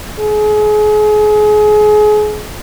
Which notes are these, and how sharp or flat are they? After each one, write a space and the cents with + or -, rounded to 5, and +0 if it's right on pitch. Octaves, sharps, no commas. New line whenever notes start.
G#4 +30